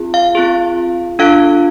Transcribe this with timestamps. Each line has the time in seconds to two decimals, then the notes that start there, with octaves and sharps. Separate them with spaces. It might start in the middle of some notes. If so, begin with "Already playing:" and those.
Already playing: C4 F4 G#4
0.14 F5
0.35 C4 F4 G#4
1.19 D4 F4 A4 F5